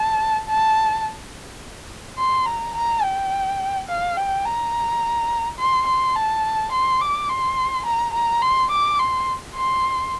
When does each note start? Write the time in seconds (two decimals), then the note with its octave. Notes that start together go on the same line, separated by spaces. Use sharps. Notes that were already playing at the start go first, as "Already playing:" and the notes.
Already playing: A5
0.49 A5
2.18 C6
2.46 A#5
2.76 A#5
3.03 G5
3.89 F5
4.17 G5
4.46 A#5
5.59 C6
5.87 C6
6.15 A5
6.72 C6
7.01 D6
7.29 C6
7.86 A#5
8.14 A#5
8.42 C6
8.71 D6
8.99 C6
9.55 C6